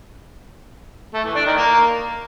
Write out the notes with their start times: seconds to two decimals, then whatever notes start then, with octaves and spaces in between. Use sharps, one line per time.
1.14 A3
1.25 E3
1.35 D4
1.46 D#3
1.57 A#3